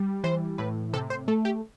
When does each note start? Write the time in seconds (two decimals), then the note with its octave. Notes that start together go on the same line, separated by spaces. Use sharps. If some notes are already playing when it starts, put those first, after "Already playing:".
Already playing: G3
0.24 E3 C5
0.58 A2 B4
0.93 C3 A4
1.10 C5
1.28 A3 A4
1.45 G4